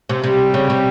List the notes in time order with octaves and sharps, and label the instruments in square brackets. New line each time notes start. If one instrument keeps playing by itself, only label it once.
[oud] C3
[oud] C3 [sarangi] G3
[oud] C#3
C3